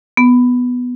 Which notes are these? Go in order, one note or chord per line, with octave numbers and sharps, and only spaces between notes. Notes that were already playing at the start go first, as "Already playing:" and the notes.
B3